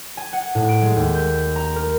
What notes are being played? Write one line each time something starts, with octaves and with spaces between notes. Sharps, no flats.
G#5
F#5
A2
D7
G#3
D#2
G6
A#5
A#4